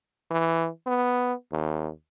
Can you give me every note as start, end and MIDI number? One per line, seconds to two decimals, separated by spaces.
0.31 0.68 52
0.87 1.34 59
1.52 1.89 39